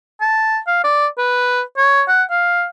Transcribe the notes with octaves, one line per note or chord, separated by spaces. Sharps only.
A5
F5
D5
B4
C#5
F#5
F5